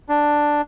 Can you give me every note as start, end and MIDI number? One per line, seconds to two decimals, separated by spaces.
0.09 0.61 62